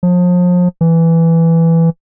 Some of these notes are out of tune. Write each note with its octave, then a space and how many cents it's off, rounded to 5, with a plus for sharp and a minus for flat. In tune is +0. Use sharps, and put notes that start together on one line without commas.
F3 +35
E3 +5